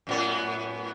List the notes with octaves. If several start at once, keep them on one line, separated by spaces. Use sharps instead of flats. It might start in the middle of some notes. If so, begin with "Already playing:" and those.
F#2 A2 B3